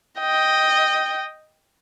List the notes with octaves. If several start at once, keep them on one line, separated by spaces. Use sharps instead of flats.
D#5 G5